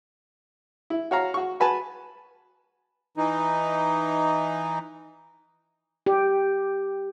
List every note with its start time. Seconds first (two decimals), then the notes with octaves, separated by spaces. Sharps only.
0.90 E4
1.11 F#4 C#5 F5 A#5
1.34 F#4 C#6
1.60 F#4 B4 G#5 A5
3.17 E3 D#4
6.06 G4